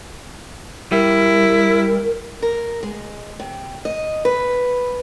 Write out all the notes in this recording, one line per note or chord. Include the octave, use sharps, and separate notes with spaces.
G3 E4 A#4
A#4
G#3
C3
D#5
B4